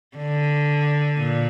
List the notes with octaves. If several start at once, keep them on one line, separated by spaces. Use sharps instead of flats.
D3
A#2